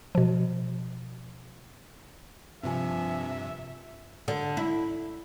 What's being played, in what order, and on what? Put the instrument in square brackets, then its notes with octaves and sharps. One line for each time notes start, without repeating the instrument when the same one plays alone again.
[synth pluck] B2 F3
[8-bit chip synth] G2 C3 [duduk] F3 [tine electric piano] C4 F4 G#5 [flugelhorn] E5
[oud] D3
E4